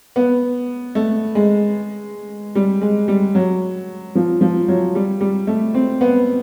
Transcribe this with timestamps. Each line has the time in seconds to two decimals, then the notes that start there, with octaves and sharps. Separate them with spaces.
0.16 B3
0.95 A3
1.35 G#3
2.55 G3
2.82 G#3
3.08 G3
3.35 F#3
4.15 F3
4.41 F3
4.68 F#3
4.95 G3
5.21 G3
5.47 A3
5.74 C4
6.01 B3